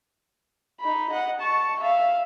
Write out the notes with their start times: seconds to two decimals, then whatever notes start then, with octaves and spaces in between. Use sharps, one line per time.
0.80 D#4 B5
1.10 D#5 F#5
1.40 A5 C#6
1.80 E5 F5